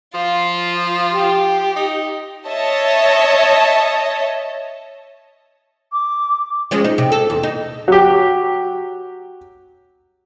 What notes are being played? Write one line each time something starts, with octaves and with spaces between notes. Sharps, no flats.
F3 F4
G4
D#4
C#5 D#5 E5 A5
D6
F3 G#3 C#4
D#4
C3
A4
E2
D#4
F#3 G4